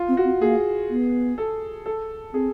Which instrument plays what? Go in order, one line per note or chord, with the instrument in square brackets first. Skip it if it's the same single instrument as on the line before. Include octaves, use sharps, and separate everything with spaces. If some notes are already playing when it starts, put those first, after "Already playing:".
Already playing: [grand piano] F4
[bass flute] C4
[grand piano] F#4
[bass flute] C4
[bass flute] A#3 [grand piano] G#4
[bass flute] B3
[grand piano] A4
A4
[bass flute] C4 [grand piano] G#4